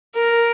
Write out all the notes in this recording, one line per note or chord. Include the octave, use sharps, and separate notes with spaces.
A#4